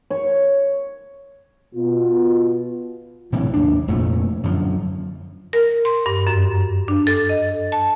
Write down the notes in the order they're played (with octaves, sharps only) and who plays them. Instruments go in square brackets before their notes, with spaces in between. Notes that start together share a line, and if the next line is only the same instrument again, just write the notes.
[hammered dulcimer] C#5
[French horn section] B2 F4
[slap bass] A2 C3 E3 F#3
D#2 D4
F1 F2 A#2 A3
F#2 D3 F3
[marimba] A#4
C6
G2
F#2
D4
A4
D#5
A5